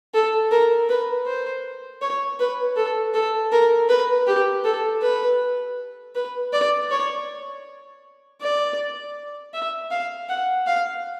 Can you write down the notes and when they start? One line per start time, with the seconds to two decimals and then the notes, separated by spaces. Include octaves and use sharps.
0.14 A4
0.51 A#4
0.89 B4
1.26 C5
2.02 C#5
2.39 B4
2.76 A4
3.14 A4
3.52 A#4
3.89 B4
4.27 G4
4.64 A4
5.02 B4
6.15 B4
6.53 D5
6.91 C#5
8.41 D5
9.53 E5
9.91 F5
10.29 F#5
10.67 F5